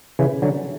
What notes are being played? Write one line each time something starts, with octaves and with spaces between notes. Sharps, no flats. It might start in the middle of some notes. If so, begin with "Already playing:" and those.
C#3 E3
D3 F#3